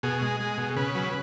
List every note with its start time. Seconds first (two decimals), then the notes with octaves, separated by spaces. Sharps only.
0.03 B2 G#4
0.22 G#3
0.40 G#3
0.58 B2
0.76 C#3 B4
0.95 F#3